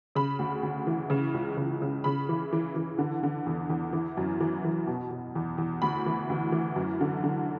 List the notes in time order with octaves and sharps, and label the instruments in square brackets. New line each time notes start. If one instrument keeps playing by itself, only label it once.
[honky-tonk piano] C#3 B5
D2
D2
E3
C#3
C#2
C#3
C#3
C#3 B5
E3
E3
E3
D3
D3
E2
E2
E3
F#2
E3
E3
B2
B2
E2
E2
D2 B5
E3
D2
E3
F#2
D3
D3